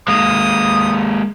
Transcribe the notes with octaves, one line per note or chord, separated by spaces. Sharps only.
G#3 A#3 D#6